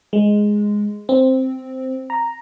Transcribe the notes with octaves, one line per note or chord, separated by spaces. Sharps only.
G#3
C4
A#5